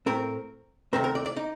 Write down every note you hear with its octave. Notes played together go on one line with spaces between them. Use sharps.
A2 A3 C4 A#4
D2 C3 D#3 A3 C4 A#4
A#4
D5
D5
D#4